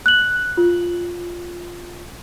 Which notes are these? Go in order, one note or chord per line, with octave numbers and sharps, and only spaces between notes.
F#6 F#7
F4